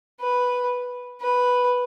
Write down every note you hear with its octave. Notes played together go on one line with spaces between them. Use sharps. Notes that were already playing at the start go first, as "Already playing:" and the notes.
B4
B4